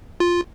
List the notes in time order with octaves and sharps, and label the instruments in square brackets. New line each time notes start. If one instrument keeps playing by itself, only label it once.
[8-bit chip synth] F4